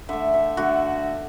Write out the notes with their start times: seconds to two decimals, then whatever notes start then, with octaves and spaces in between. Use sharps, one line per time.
0.09 D3 A3 E5
0.34 E5
0.57 D3 A3 F#4